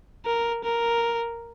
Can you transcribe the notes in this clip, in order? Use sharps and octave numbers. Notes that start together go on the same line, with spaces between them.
A#4
A#4